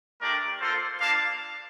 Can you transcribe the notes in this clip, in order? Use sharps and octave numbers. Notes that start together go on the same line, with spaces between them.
A3 D4 G4 A#4 D5
A#3 F4 A4 C5
A#3 D4 F4 F5 A5